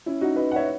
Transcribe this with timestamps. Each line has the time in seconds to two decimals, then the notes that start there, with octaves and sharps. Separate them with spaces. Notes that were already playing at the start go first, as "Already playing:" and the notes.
0.06 C#4 E4
0.21 D#4 F#4
0.36 B4 D#5
0.51 F#5
0.56 C#5 E5